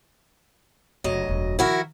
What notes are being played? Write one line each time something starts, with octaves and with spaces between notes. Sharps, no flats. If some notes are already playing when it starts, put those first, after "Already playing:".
F#1 D2 F#3 D#5
E1 F#2
D#3 F3 E4 F#4 A#4